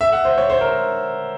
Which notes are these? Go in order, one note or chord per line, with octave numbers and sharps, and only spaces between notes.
E5
F#5
C5
C#5
C5
A#4